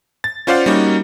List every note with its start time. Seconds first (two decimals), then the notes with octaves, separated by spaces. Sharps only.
0.24 A6
0.47 C#4 F4 C5 D5 F5 F#5
0.66 G3 A#3 C#4 D#4 F#4